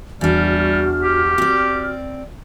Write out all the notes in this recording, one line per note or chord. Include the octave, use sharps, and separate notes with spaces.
E2 G3 D4 F#4 F6
G4
C4 D5